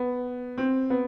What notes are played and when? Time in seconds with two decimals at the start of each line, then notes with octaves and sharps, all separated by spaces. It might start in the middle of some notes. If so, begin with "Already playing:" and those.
Already playing: B3
0.58 C4
0.90 B3